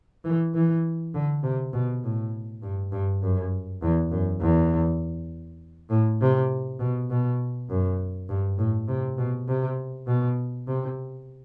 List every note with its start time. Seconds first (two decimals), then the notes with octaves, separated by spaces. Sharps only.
0.25 E3
0.54 E3
1.14 D3
1.43 C3
1.73 B2
2.03 A2
2.63 G2
2.92 G2
3.22 F#2
3.82 E2
4.11 F#2
4.41 E2
5.90 A2
6.21 C3
6.79 B2
7.10 B2
7.70 F#2
8.29 G2
8.58 A2
8.88 C3
9.18 B2
9.48 C3
10.07 B2
10.67 C3